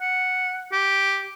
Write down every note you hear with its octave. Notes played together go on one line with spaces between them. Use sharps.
F#5
G4